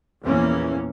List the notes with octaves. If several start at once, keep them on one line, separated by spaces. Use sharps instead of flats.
A#1 E2 E3 A#3 C#4